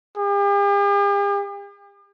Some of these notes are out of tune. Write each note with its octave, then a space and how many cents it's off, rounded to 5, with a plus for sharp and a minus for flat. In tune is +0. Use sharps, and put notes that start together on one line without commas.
G4 +45